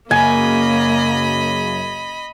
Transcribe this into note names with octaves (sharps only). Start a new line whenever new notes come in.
F#2 C#3 A#3 D#5 G#5 B5